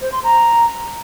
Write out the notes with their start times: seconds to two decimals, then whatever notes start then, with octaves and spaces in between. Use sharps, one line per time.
0.01 C5
0.12 C6
0.23 A#5